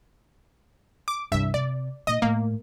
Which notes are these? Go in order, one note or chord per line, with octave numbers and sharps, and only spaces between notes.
D6
C2 G2 E3 E5
C3 D5
A#2 D#3 D#5
A2 A#3